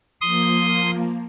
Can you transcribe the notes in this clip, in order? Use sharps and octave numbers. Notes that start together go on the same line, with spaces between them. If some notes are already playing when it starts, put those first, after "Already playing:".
F3 A#3 C6 D#6